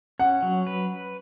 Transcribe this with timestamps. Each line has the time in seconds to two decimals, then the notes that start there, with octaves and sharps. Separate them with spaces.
0.20 C#4 F#5
0.42 F#3
0.67 B4